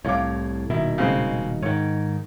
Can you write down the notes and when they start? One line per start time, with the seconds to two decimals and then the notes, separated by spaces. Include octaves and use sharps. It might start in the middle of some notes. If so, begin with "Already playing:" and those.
0.05 C2 A2 C#5 F5 D6
0.70 D#1 B2 D#3 E4
0.98 C#3 G#3 C4
1.63 G#2 D#3 C#5